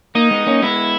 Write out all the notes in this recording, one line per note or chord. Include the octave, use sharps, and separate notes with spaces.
A#3 D#4
G#3 B3
A#3 C#4
G#3 B3 E4